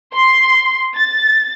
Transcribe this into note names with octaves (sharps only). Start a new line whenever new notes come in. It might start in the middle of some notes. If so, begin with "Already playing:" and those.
C6
A6